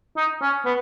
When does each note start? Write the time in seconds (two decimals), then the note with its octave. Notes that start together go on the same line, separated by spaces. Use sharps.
0.17 D#4
0.42 C#4
0.65 B3